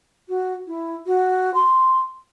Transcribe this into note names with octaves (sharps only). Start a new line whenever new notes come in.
F#4
E4
F#4
C6